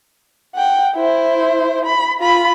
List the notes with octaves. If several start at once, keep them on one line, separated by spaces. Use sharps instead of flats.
F#5 G5
E4 C5
B5
F4 B5